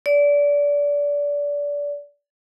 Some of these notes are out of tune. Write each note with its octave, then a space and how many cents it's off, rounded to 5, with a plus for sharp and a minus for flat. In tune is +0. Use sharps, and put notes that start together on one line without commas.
D5 -25